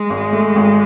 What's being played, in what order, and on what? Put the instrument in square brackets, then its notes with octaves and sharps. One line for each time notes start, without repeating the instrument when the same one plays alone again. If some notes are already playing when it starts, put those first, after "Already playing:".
Already playing: [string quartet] G#3
[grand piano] G#1
A3
G#1